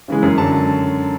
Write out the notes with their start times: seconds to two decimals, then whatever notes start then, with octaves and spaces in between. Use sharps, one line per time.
0.08 C#3 E3 G#3
0.23 F#2
0.37 D3 F#3 A5